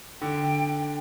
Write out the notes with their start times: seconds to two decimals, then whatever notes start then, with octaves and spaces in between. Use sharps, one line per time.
0.21 D3 G5